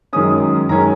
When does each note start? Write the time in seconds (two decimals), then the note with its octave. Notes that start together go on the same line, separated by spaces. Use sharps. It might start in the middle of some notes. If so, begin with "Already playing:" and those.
0.13 F#2 D#3 G#3 C#4 D#6
0.69 F#2 D#3 G#3 C#4 A#5